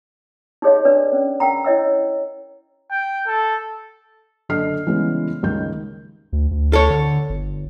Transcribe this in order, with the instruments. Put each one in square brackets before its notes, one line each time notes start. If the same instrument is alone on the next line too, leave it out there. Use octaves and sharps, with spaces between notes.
[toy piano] D#4 G4 G#4 C#5 D#5 F5
D4 B4 D5
C#4
A#4 F#5 G5 A#5
E4 C#5 D#5 E5 F#5 E6
[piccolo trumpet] G5
A4
[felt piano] F#1 D3 A4 D#5 F6 C7
C#3 E3 G3 G#3 B3
C#2 G2 D#3 G6
[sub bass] D2
D2
[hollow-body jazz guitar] A4 C#5
[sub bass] D3
G1